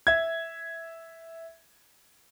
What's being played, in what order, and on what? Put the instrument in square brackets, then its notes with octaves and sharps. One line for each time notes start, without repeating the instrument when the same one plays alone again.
[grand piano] E5 G#6